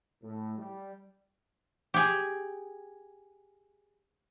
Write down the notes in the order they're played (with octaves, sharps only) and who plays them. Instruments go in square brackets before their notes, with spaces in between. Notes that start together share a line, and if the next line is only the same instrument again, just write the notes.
[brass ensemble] A2
G3
[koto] G4 G#4